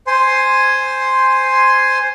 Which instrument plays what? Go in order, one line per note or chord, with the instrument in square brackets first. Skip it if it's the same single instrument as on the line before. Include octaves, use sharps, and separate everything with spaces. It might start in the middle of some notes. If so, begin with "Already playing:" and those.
[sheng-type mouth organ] C5 G#5 C6